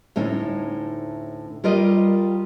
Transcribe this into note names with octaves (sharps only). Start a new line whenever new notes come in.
D2 A2 C#4 D#4
G3 F4 A#4 D5 D#5